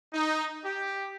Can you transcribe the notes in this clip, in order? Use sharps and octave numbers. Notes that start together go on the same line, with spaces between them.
D#4
G4